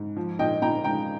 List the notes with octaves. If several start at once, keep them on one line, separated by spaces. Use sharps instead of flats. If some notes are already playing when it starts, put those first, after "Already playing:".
Already playing: G#2
F3
A#2 D#5 G5
A#2 G5 A#5
G#3 G5 A#5